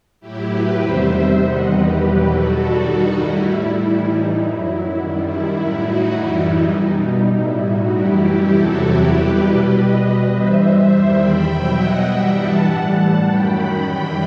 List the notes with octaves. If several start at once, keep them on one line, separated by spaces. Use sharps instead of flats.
A2 F#3 E4 G4
G4 B4
E2 C3 D#3 G3 C5 E5
E2 D#3 G3 D#5 F#5
G4 B4
E2 B2 F#3 G4 B4
F#4 A4
G2 D#3 G3
D#4 F#4
A2 G3 E4
E4
A2 E3 G3 E4
D#4
F#2 F#3 E4
F#2 D#3 G3
E4
A2 F#3 E4
D#4 F#4
F#2 E3 G3 E4
D#4
B2 G3
A2 G3 E4
D#4 F#4
F#2 E3 G3 E4 G4
E4 G4
E2 C3 F#3 F#4 A4
E4 G4
B2 G3 G4 B4
G4 B4
B2 G3 B4 D#5
G2 E3 G3 C5 E5
E2 D#3 G3
G5 B5
B2 F#3 E5 G5
D#5 F#5
G2 E3 G3 E5 G5
F#5 A5
A2 E3 G3
F#2 D#3 F#3 G5 B5
F#2 E3 G3